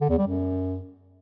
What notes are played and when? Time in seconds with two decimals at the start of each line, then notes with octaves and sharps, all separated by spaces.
0.01 D3
0.09 E2
0.18 G3
0.27 F#2